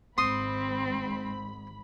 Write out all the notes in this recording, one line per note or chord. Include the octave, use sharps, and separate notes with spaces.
G#1 G#2 C4 B5 C6 D#6